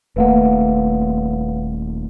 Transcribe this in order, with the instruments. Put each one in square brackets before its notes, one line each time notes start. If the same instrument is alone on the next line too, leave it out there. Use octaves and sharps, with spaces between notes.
[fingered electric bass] D#1 A3 A#3 [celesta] B4 F5 F#5